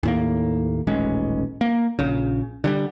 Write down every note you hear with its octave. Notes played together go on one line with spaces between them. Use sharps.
D#2 A2 A#3
D#1 A1 G#3 C#4
A#3
A#1 C#3
D3 F#3 G3